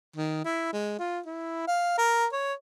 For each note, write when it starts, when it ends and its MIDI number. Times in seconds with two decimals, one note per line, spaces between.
0.16 0.41 51
0.44 0.73 64
0.73 0.98 56
0.99 1.20 65
1.26 1.63 64
1.67 1.97 77
1.98 2.26 70
2.33 2.53 73